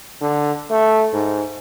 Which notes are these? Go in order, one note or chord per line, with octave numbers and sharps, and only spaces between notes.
D3
A3
G#2